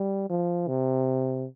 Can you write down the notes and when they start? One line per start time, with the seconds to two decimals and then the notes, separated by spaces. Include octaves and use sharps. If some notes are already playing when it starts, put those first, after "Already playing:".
Already playing: G3
0.30 F3
0.68 C3